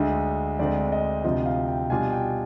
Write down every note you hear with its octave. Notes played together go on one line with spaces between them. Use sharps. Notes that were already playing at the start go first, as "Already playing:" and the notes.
Already playing: D2 D3 G#3
D2 D3 G#3 C4 D5
D#5
D2 C3 F3 C4 F4 D#5
F5
G5
B2 G3 D4 F4 G#5
G5